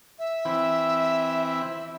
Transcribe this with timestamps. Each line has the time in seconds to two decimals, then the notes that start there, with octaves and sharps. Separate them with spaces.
0.19 E5
0.45 E3 C4 E4